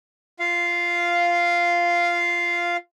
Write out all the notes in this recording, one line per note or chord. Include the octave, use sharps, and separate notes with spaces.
F4 F5